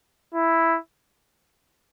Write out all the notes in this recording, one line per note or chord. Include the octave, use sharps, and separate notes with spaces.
E4